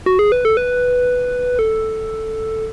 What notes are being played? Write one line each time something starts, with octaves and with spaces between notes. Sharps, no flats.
F#4
G#4
B4
A4
B4
A4